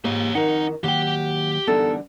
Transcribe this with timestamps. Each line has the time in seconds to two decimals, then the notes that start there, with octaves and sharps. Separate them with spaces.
0.05 G#2 A#3 F4 G4 C#5
0.35 F2 D#3 D#4 A#4 F#5
0.84 D#3 F#3 A#3 G4 F#5 G5
1.68 D3 E3 G3 B3 D#4 A4 A#4